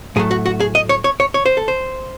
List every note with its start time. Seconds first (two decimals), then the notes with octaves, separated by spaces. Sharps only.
0.16 A2 F#3 A3 G#4
0.31 F#4
0.46 F#4
0.60 G#4
0.75 D#5
0.89 C#5
1.04 C#5
1.20 C#5
1.34 C#5
1.46 C5
1.57 A4
1.68 C5